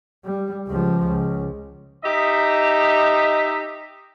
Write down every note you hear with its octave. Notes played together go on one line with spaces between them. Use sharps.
G3
C#2 F3
C#2
D#4 G4 D#5 E5